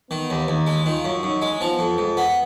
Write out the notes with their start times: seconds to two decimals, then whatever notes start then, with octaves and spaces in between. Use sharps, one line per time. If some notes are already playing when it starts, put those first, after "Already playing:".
0.11 D#3 B3
0.30 D#2
0.48 D#2 D#4
0.67 G#3
0.86 D#3 F4
1.05 F#2
1.23 F#2 D#4
1.42 G#3
1.61 F3 B3
1.79 F2
1.98 F2 G#3
2.17 B3